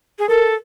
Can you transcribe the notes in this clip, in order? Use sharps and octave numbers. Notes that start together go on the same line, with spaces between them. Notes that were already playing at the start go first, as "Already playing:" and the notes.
G#4
A4 A#4